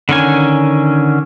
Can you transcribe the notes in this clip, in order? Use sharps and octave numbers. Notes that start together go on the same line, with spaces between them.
D3 D#3 C#4 G#5